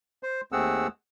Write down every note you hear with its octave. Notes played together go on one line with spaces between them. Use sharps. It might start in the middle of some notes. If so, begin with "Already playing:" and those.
C5
D#2 A3 C4 G#4 F#5 E6